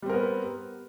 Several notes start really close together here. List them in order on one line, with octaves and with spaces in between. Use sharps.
G3 C4 A#4 B3